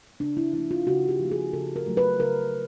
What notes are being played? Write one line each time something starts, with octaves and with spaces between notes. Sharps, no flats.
C#3 D4
E4
F3 A#3 E4
F4
C#3 F#4
G4
F3 A#3
G#4
C#3 A4
A#4
F#3 A3
B4
C#3 A#4